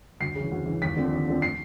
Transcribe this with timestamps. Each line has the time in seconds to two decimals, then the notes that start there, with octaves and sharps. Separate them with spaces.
0.20 D2 C7
0.35 C#3
0.40 E3
0.51 D2
0.66 C#3 E3
0.82 D#2 B6
0.96 D3 F3 A3 C4
1.13 D#2
1.28 D3 F3 A3 C4
1.42 C7